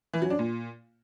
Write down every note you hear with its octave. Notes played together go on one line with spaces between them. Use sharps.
E3
F#3
D4
A#2